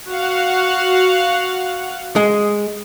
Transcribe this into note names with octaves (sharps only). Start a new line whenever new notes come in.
F#4 F5 F#5
G#3